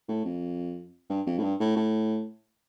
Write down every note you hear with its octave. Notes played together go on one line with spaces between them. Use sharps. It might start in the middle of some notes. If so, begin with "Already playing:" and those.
A2
F2
G2
F2
A2
G2
A2
A2